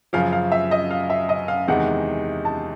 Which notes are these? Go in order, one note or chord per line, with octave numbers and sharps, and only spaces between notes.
F#2 C#3 F3 F5
F5
E5
D#5
F5
E5
D#5
F5
E2 C3 D#3 G#3 F#5
A5